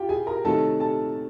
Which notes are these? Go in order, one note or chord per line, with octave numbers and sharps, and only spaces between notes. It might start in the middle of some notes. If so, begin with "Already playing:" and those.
Already playing: F4 G4 G5
G#4 G#5
A#4 A#5
C3 D#3 F#3 A3 A4 A5
A4 A5